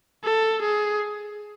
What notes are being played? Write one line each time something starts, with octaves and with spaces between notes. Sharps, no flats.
A4
G#4